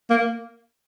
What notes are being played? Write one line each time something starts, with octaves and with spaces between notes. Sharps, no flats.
A#3